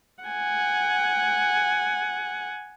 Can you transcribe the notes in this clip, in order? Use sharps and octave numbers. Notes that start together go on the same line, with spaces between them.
F#5 G#5